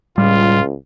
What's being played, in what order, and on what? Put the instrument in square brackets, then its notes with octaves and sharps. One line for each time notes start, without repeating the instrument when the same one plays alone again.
[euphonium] C#2 [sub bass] A2 [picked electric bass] G3 [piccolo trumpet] F4